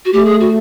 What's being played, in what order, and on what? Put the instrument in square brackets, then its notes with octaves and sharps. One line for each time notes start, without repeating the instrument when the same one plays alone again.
[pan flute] F#4
[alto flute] A3 [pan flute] G4
[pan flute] G#4
F#4